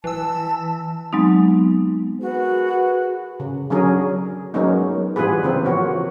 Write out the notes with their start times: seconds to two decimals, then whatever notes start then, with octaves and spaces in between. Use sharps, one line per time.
0.04 E3 A5 E6
1.13 F#3 G#3 B3 C4 D#4
2.21 F#4 G#4 A#4 B4
3.40 C#3
3.70 D3 F#3 C#4 G#4 A#4
4.54 F#3 G#3 A#3 B3 C#4 D#4
5.16 E3 G3 B3 F4 G#4 B4
5.43 C#3 C4 F4
5.65 F3 A#3 F#4 C#5